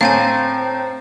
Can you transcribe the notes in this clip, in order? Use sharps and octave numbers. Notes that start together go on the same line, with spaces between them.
A2 C4 F5 G5 G#5 A#5 A6